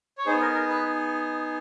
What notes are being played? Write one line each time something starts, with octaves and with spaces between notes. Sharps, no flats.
C#5
B3 D#4 G#4 C5
A#4
A#4
B4